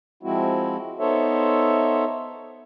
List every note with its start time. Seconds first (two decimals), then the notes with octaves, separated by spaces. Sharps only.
0.23 F3 G#3 C4 E4 F#4
0.99 B3 D#4 A4 C5 C#5 E5